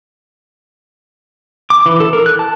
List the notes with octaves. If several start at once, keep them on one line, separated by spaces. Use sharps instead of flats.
D6
E3
A4
A#4
F#6
A5